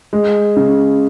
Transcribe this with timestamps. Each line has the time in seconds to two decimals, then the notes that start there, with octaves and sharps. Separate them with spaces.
0.13 G#3
0.57 C#3